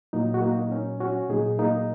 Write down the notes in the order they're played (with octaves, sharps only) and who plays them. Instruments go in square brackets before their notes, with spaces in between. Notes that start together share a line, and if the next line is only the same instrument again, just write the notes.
[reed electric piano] A#2 F#3 A#3 D#4
F#4
A#3 D#4
D#4
C#4
C#4 F#4
A#2 F#3 D#4 G#4
A#3 D#4